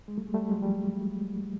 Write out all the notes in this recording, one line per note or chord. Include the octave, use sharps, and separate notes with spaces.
G#3
G3 A3
G#3
G3 A3
F#3 G#3
F3 G3